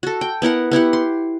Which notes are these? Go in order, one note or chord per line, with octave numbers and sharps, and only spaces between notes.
F#4 A4
G5
B3 E4 A#4 F#5
B3 E4 G4 F#5
C6